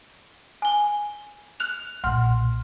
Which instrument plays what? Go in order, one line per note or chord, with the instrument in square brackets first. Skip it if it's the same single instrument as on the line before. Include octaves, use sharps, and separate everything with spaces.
[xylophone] G#5 G7
F6 F#6 F7
[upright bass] B1 A#2 [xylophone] F#5 C6 F6